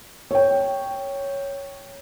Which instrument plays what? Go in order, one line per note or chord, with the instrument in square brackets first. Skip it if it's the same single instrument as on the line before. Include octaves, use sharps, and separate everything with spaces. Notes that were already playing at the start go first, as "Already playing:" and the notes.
[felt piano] C#5 G5